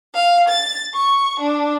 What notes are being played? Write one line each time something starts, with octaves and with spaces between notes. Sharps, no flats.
F5
A6
C#6
D4